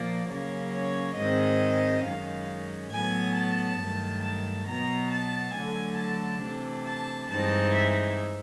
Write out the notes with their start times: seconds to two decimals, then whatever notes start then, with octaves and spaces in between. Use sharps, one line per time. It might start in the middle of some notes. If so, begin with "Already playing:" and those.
Already playing: A#2 F3 A#3 D5
0.28 C#3 F#3 A#3 C#4 C#5
0.73 C#5
1.16 G#2 D#3 G#3 C4 D#5
2.04 F#2 D#3 G#3 C#4 F5
2.91 A2 F#3 B3 G#5
3.36 A5
3.80 G2 D#3 F#3 A3
4.24 A5
4.67 B2 F#3 B3 A#5
5.11 A5
5.54 D3 F#3 A3 G#5
5.99 A5
6.42 C3 E3 A3 D4
6.86 A5
7.31 G2 E3 G#3 C4 D#4 A5
7.74 E5